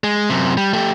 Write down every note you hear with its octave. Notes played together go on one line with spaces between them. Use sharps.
G#3
F#2 C3
G3
A3 G4